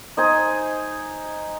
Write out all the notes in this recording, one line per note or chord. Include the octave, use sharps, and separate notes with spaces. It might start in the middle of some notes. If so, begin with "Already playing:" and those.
D#4 C5 D#5 G#5